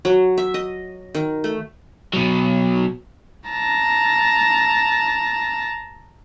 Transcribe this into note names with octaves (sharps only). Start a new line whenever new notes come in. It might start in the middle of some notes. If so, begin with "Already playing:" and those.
F#3
E5
D#5
D#3
A3
B2 F#3
A5 A#5